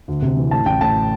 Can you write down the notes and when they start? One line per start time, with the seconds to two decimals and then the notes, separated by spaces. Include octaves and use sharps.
0.08 D2
0.22 C3
0.37 E3
0.51 A2 A5
0.66 A1 G5
0.81 A2 A5